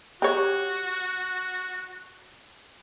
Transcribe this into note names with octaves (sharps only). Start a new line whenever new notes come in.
F#4 G4 C#5